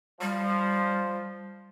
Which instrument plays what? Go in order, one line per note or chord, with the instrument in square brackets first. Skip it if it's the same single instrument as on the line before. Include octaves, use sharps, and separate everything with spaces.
[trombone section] F3 [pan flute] G3